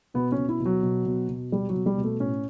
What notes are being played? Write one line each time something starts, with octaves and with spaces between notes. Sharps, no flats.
B2 B3
C#4
B2
E4
B2
F#3
B2
B2
B2
B2 G3
F#3
B2
G3
B2
A3
A2 C#4